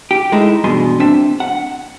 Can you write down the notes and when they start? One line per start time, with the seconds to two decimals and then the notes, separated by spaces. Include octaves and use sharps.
0.11 G4
0.32 G#3 A3 D#4 E4
0.64 E2 G2 B2 G#4 C6
1.00 C4 D4 E5
1.40 F#5